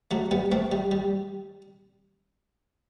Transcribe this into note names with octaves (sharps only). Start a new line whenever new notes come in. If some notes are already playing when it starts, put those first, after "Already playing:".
F#3 A3
G3 B3
A3 C4
G3
G3